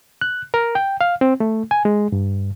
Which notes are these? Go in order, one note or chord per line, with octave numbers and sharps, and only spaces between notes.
F#6
A#4
G5
F5
C4
A3
G#5
G#3
G2